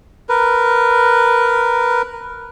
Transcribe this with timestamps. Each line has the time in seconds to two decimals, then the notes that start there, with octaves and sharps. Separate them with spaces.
0.29 A#4 B4